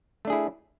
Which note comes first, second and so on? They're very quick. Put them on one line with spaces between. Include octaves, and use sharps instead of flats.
A3 D4 G#4 E4